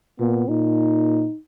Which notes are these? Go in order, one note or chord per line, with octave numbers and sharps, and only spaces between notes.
A#2 B3
A#2 D#4